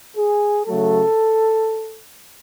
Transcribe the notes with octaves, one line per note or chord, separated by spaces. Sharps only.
G#4
C#3 F#3 A3 A4